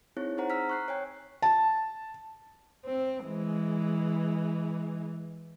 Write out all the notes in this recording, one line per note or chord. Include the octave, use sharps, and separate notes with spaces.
C4 D#4 E4 G#4 C#5
C4 D#4 G#4 C5 F#5 A#5
A#5 E6 F6 B6
C#6 F#6 C7
C#5 G5 G#5
A5
C4
E3 G#3